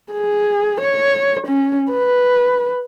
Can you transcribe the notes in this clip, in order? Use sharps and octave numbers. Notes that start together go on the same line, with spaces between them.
G#4
C#5
C#4
B4